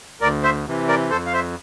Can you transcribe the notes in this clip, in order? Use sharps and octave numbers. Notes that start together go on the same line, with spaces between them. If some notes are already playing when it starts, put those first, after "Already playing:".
D2 A#4 D5
C5 E5
C3 E3
A#4 D5
F2 A4 C5
F5
C5 E5